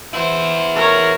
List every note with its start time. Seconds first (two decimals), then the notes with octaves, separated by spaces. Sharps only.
0.13 B3 E4 C5
0.76 A#4 C#5